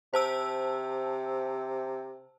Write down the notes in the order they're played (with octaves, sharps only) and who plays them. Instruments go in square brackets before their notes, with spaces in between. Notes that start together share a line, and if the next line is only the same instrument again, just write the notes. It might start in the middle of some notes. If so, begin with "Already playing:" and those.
[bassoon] C3 [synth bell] C5 A5 E6